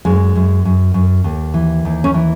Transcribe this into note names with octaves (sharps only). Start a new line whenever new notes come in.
F#2 G#3
F#2
F#2
F#2
D#2
E3
D#2
C#4
E3